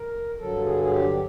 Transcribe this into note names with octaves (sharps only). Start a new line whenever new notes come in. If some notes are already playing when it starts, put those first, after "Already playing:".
Already playing: A#4
G2 D3 F#3 A4
G#4
G#4
G4